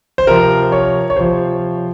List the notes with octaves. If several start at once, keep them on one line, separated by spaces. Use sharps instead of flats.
C5
C3 F3 A#4
C#5
C#5
C3 F3 C5